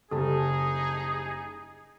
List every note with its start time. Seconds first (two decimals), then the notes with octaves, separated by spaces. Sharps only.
0.11 F#1 G3 D#4 G#4 A4 A5